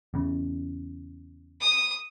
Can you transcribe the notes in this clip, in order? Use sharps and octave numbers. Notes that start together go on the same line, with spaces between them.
E2 C#3
D#6